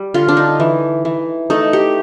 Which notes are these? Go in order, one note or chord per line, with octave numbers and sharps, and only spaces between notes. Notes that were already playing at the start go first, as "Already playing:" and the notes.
Already playing: G3
D3 F4
D4
D#4
E3
E3
A3 D#4
G4